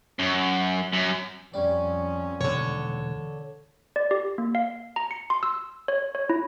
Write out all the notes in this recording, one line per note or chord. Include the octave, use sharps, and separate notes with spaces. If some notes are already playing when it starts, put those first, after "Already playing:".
F#2
F#2
F2 G3 C#4 D5
E1 D#2 D3 C#5
D5
G4
A#3
F5
A#5
C#7
C6
E6
C#5
C#5
E4